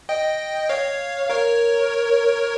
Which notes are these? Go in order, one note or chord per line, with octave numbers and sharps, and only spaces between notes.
D#5 G5
C#5 F5
A#4 C#5